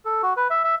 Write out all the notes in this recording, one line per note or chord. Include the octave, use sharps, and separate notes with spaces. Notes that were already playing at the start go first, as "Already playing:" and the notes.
A4
F#4
B4
E5
E5